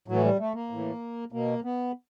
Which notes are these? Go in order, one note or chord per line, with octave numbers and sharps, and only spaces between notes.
A2 E3 F#3
G3
A3
A#3
A2 E3
B2 A#3
B3